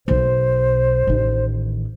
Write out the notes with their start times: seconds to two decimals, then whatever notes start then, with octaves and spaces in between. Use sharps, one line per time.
0.08 B1 B2 C5
1.07 A1 D#3